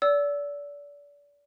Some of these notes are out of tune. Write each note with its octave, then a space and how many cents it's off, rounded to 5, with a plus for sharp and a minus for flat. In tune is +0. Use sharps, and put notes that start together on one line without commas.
D5 -30 E6 +0